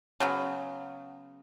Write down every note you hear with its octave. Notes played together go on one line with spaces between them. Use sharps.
C#3 F#3 B3